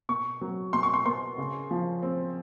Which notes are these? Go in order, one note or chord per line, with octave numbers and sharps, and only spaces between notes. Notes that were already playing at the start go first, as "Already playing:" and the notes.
B2 C#6
F#3
B2 C6
C#6
C6
B3 C6
C#3
F3
C4